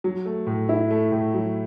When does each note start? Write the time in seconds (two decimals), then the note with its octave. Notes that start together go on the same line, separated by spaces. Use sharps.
0.04 F#3
0.25 A3
0.47 A2
0.69 E4
0.91 A3
1.12 A2
1.34 F#3